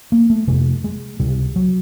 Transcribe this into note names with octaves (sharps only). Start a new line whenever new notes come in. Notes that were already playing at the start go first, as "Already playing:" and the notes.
A#3
A3
F2 C3 G#3
G#3
C#2 C3 G3
F#3